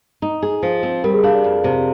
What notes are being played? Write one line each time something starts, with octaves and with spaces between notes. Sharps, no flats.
D#4
G#4
F3
C4
G3 A#4
G#4
D4 F5
D5
F2
C3